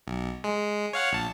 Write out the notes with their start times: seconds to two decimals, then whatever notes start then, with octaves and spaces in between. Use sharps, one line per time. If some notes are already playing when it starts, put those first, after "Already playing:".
0.07 B1
0.44 G#3
0.93 C#5 F5 F#5
1.12 A#1 A5